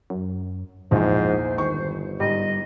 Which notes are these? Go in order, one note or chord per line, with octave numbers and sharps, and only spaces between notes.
F#2
A#1 E2 G#2 F3 C5
G1 D#3 C#6
G#2 G3 D#5